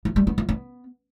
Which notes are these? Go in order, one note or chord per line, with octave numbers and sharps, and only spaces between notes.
F3
G3
B3
F3
B3